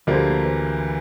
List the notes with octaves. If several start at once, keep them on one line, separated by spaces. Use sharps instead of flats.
D2 D3 F3 G3 A#3
E3